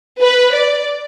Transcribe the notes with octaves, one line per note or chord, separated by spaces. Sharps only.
B4
D5